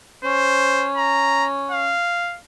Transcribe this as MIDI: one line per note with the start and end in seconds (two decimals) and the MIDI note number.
0.24 1.97 61
0.24 0.88 72
0.97 1.47 82
1.71 2.38 77